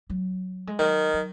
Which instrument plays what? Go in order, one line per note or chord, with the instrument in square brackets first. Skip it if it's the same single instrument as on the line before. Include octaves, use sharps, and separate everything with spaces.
[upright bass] F#3
G#3
[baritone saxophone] D#3 [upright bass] F#3
[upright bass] F#3